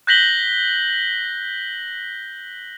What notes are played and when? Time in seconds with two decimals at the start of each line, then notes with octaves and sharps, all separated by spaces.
0.07 F#6 G6 A#6 B6 F#7 G7